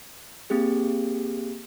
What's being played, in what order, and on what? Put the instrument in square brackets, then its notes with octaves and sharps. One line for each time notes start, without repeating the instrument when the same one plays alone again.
[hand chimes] A#3 C4 G4 G#4